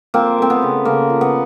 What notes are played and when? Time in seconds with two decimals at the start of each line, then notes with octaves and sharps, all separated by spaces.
0.14 F3 A#3 C4
0.38 A3 C4
0.50 B3
0.62 C#3
0.85 C#3 A#3
1.10 F3
1.21 B3